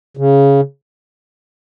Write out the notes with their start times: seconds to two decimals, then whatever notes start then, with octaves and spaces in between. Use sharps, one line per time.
0.17 C#3